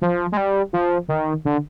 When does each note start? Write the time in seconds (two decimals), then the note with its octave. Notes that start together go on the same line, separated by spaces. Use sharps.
0.02 F3
0.32 G#3
0.37 G3
0.73 F3
1.08 D#3
1.45 D3